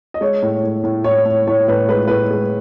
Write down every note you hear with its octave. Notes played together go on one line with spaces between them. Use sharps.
D#5
G#3 C#5
A2
A2
A2
A2 C#5
A2
A2 C#5
A2 B4
G#3 B4
A2 B4
G#3